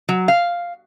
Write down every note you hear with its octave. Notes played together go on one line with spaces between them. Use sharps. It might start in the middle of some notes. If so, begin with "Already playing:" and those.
F#3
F5